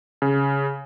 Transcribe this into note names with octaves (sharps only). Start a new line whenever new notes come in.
C#3